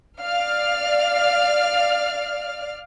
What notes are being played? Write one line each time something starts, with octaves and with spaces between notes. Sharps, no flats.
D5 F5 F6